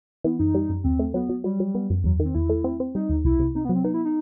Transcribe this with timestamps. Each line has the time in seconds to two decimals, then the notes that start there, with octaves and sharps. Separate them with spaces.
0.24 E3 B3
0.39 F#2 D#4
0.55 G3
0.69 F#2
0.84 D#2 C4
0.99 A3
1.14 F#3 B3
1.29 F#3
1.44 F#3 G3
1.60 F#3
1.75 B3
1.90 F#2
2.04 E2 F#3
2.20 D#3
2.25 C4
2.35 E2 E4
2.49 A3
2.64 C4
2.80 C4
2.94 G3 D#4
3.09 D#2
3.25 C2 E4
3.39 C3
3.55 C3 D#4
3.65 B3
3.69 F#3
3.75 C4
3.84 B3 D#4
3.94 E4
4.05 D#4